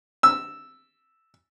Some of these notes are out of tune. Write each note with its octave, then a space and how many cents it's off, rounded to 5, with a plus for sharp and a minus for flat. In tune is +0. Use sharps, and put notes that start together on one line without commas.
E6 +0